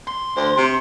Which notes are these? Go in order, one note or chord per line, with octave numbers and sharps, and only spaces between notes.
C6
D2 C5
C3 G5